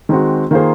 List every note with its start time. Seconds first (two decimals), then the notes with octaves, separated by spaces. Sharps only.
0.09 D#3 G#3 C4 F#4
0.51 D#3 A#3 F4 G#4 C5